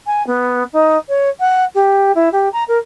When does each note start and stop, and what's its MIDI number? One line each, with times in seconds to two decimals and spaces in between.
0.07 0.25 80
0.27 0.64 59
0.73 0.98 63
1.09 1.29 73
1.40 1.65 78
1.75 2.12 67
2.15 2.29 64
2.32 2.49 67
2.53 2.64 82
2.68 2.78 70